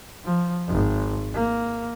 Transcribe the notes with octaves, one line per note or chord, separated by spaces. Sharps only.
F3
G#1
A#3